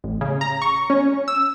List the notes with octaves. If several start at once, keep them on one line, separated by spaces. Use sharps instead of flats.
A1
C#3
A#5
C#6
C#4
E6